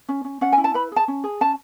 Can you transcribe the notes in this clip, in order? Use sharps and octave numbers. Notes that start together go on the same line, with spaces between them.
C#4
C#4
C#4 F#5
G#5
E4
A5
B4 B5
G#4 A5
C#4
G#4
C#4 A5